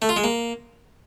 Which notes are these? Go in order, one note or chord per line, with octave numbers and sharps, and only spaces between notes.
A3
F4
G#3
A#3